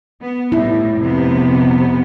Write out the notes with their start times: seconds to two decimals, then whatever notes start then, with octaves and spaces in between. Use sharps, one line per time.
0.22 B3
0.52 A2 G3 E4
1.01 F2 C3 B3